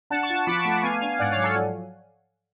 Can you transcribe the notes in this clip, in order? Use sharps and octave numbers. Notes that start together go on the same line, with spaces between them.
D4 F#5 A5
A5 C#6
F4
A5 C#6
F3 B5 D6
A5 C#6
A3
F#5 A5
B3 F5 G#5
D4 F5 G#5
G#2 D5 F#5
C#5 F5
F#3
A4 C#5
F3